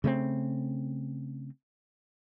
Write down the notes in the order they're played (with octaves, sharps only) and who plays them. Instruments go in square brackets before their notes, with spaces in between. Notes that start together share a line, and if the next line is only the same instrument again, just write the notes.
[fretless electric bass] C#3 A3 A#3 C4